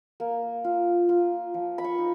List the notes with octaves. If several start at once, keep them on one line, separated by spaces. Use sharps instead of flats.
A#3
F4
F4
F3
B5
C#6
D#4